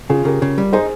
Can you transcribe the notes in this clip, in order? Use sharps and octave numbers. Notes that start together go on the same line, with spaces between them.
C#3 F4 G#4
C#3 G4 A#4
C#3
G3
D#4 G#4 C5